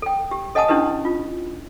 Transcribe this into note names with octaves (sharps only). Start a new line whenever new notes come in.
A4 G5
G4
A4 D#5 F#5 G#5 A5 D#6
C#4 D4 E4 G4 B4 D#6
F4